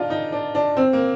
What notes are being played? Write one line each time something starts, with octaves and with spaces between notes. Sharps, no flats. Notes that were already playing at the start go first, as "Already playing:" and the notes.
Already playing: D4 D#4 F4
D#4
D4
D4
C4
A#3